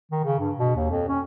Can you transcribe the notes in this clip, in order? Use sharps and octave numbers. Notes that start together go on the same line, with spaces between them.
D#3
C#3
G2
B2
D#2
F2
C#4